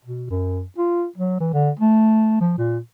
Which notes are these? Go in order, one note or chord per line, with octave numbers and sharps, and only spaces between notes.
B2
F#2
F4
F#3
E3
D3
A3
F3
A#2